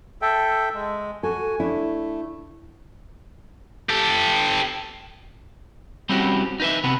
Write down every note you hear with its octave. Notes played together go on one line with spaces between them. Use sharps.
A4 E5 G5
G#3
F#4 A4 G#5
A3 D4 E4
G4 A4
G3 C4 C#4 E4 F#4 G4
D#4 B4 E5
C3 B3 C4 B4